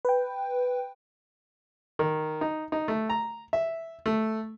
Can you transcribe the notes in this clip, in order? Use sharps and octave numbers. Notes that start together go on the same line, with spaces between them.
B4 G5
D#3
D#4
D#4
A3
A#5
E5
A3